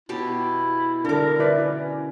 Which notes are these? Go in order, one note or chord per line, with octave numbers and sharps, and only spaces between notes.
B2 E4 G4 A5
D3 D4 A4 A#4 D6
E4 B4 D5
C#4